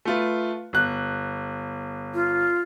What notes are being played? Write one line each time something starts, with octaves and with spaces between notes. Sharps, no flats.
A3 F4 B4
G1 F#6
F4